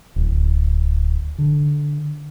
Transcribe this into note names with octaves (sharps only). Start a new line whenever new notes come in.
D1
D3